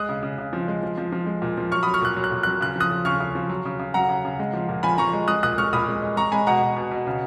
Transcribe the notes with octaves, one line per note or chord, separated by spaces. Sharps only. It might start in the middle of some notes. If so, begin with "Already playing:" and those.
Already playing: G#3 D#6 F#6
C#3
C#3
C#3
F3
G#3
F3
F3
F3
G#3
A#2
F3
F#3 C#6 F6
F#3 B5 D#6
C#6 F6
A#2 F#6
F#3
F#6
A#2
F#3 F#6
C#3 F#6
F3 D#6 F#6
F3
C#3 C#6 F6
C#3
F3
F#3
C#3
C#3
F#3 F#5 A#5
C#3
C#3
G#3
F3
A#2
F3 G#5 B5
F3 A#5 C#6
G#3
G#3 D#6 F#6
A#2 D#6 F#6
G#3 C#6 F6
A#2 B5 D#6
G#3
G#3
G#3 A#5 C#6
G#3 G#5 B5
B2 F#5 A#5
B2
B2
B2
C#3